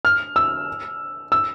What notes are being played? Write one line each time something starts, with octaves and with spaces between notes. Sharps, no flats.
F6
E6
E6